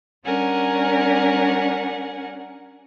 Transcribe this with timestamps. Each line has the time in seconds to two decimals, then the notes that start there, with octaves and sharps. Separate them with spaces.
0.25 G3 C#4 D4 A#4 F#5 G#5